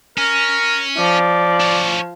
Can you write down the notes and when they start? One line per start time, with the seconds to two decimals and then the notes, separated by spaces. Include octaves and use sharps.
0.18 C#4 A#4
0.98 F3 D5
1.60 D4 C#5